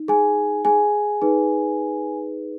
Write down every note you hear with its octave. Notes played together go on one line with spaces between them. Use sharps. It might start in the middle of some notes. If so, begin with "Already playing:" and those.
Already playing: D#4
G#4 G#5
G#4 G#5
D#4 G#4 B4